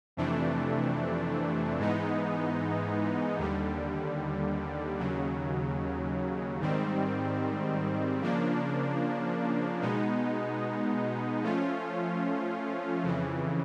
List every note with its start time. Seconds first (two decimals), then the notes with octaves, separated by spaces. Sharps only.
0.17 F2 C3 E3 A3 D4
1.78 G#2 E3 G#3 B3 D#4
3.38 D#2 D3 G3
4.99 D#2 C#3 F#3
6.60 G#2 D#3 G3 C4
8.21 C#3 F3 A#3 D4
9.82 B2 G#3 B3 D#4
11.43 F3 A3 C#4 F4
13.03 F2 C#3 E3